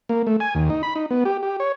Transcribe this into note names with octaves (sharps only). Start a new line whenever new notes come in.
A#3
A3
G#5
D#2
D#4
B5
D#4
B3
G4
G4
C#5